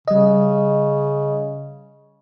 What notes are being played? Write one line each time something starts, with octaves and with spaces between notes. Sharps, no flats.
C#3 G3 D#5